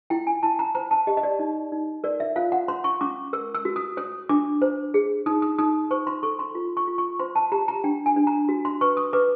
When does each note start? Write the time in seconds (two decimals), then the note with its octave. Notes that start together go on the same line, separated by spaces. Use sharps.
0.10 E4 G5
0.27 G#5
0.43 E4 A5
0.59 A#5
0.75 C5 A#5
0.91 A5
1.07 G4 D#5
1.17 D#5
1.23 D5
1.39 D#4
1.72 D#4
2.04 A#4 D5
2.20 E5
2.36 F4 F5
2.52 F#5
2.68 C#5 C6
2.84 C#6
3.01 C#4 D6
3.33 A#4 E6
3.55 E6
3.65 F#4
3.76 D#6
3.97 C#5 D#6
4.29 D4 D6
4.62 C5
4.94 G#4
5.26 D#4 D#6
5.42 D#6
5.59 D#4 D#6
5.91 C5 C#6
6.07 C6
6.23 A4 C#6
6.39 C6
6.55 F4
6.77 C#6
6.88 F4
6.98 C#6
7.19 C5 C6
7.35 A5
7.52 G4 A#5
7.68 A#5
7.84 D4 G5
8.06 G#5
8.16 D4
8.27 A#5
8.49 F#4
8.65 C6
8.81 B4 C#6
8.97 D#6
9.13 B4 D6